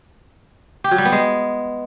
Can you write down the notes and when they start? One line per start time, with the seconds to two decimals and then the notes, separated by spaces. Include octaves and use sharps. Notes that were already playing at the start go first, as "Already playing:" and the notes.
0.84 G4
0.91 F#3
0.98 G3
1.05 B3
1.12 G#3